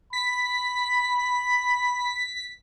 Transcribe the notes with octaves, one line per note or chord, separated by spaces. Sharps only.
B5 B6